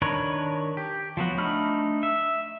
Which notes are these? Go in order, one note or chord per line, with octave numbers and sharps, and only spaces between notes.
D#3 D4 A#4 B4 C#5
G4
F3 F#3 B3 F#4
A3 D4 D#4 B5 F6
E5